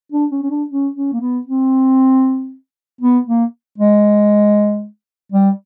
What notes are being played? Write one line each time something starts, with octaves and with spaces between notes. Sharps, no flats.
D4
C#4
C#4
D4
C#4
C#4
A#3
B3
C4
B3
A#3
G#3
G3